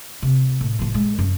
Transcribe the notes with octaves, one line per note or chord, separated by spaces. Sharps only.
C3
A2
A2 F3
G#3
F#2